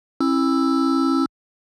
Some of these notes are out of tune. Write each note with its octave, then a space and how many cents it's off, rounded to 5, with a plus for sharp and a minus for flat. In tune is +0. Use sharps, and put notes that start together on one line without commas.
C#4 -45 E4 +0 E6 +0